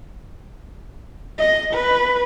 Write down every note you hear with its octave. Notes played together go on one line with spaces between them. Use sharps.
D#5
B4